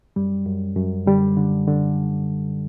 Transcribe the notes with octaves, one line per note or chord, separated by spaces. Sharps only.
F#2 G3
F#2
F#2
D3 G3
D3
D3